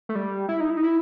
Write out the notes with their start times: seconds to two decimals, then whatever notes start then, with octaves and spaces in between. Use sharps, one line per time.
0.09 A3
0.15 G3
0.49 E4
0.60 D#4
0.70 E4
0.77 D#4
0.83 E4